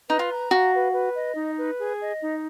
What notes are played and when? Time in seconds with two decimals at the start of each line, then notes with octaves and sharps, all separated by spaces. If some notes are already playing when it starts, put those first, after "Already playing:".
0.08 D#4 B4
0.19 F4
0.30 A#5
0.51 F#4 F5
0.73 B4
0.93 B4
1.15 D#5
1.35 D#4
1.57 B4
1.79 G#4
2.00 D#5
2.21 D#4